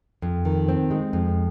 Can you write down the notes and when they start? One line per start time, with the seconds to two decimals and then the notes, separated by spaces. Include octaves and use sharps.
0.22 F2
0.45 D#3
0.69 C4
0.91 G#3
1.13 F2